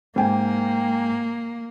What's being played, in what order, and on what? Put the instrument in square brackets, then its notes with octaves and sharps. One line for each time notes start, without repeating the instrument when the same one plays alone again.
[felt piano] G#2 G5 G#5 [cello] A#3